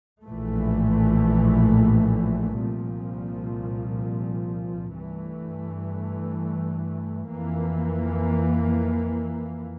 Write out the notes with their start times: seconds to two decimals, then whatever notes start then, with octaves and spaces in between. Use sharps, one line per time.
0.23 A#1 A2 E3 A3
2.59 C2 A#2 F3
4.95 G2 E3 A3
7.31 F2 E3 A#3